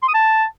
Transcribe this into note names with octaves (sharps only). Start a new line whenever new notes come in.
C6
D#6
A5